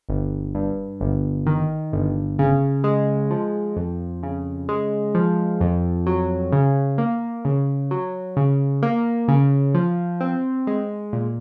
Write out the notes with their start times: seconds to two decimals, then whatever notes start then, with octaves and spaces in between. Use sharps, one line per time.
0.09 G1
0.55 G2
1.01 G1
1.47 D#3
1.92 G1
2.39 C#3
2.84 G#3
3.31 F3
3.77 F2
4.23 C#3
4.69 G#3
5.15 F3
5.61 F2
6.07 F#3
6.52 C#3
6.98 A#3
7.45 C#3
7.91 F#3
8.37 C#3
8.83 A#3
9.28 C#3
9.74 F3
10.21 C4
10.67 G#3
11.13 A#2